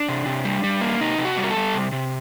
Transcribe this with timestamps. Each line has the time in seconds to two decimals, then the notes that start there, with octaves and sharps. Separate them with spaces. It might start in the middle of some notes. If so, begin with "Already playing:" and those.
Already playing: D4
0.08 C3
0.26 C3
0.44 G3
0.64 G3
0.81 A#3
1.01 C3 D#4
1.18 C3
1.25 F#4
1.37 G3
1.44 A#4
1.50 A4
1.56 G3
1.74 C3
1.92 C3